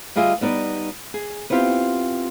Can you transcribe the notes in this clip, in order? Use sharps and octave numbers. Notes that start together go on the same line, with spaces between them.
D2 G3 F4 G#4 D#5 E5
G3 B3 D#4 D5
G#4
B3 C4 E4 F4 G4